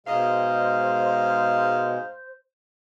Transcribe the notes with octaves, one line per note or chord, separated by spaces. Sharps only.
G#2 B2 G#3 C5 D#5 F5